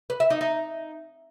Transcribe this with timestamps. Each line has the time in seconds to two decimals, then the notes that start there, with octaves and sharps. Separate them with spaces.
0.10 B4
0.20 E5
0.30 D#4
0.41 D#4